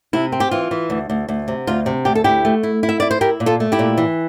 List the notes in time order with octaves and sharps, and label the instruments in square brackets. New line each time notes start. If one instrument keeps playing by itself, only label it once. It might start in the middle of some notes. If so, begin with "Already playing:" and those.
[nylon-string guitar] C3 E4
C4
G4
E3 F4
E3
D2
D2
D2
C3
D2 F4
C3
D2 G4
A4
D2 E4 G4
A3
E4
E4
E5
E4 D5
C5
E4 G4 A#4
A#2
F4 A4
A3
E4 G4
A#2
E3